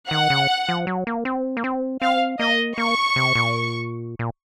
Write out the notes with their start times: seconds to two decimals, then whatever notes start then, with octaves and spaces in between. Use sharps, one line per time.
0.11 D#3 F#5
0.30 C#3
0.69 F3
0.87 F#3
1.07 A#3
1.25 C4
1.57 A#3
1.64 C4
2.02 C4 F5
2.39 A#3 D#5
2.77 A#3 C#6
3.16 C3
3.35 A#2
4.19 A#2